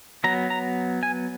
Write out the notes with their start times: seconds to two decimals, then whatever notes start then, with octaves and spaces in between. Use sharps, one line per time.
0.24 F#3 B3 A#5
0.50 A#5
1.03 G#5